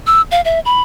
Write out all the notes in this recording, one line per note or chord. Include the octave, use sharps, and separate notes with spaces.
E6
F5
E5
B5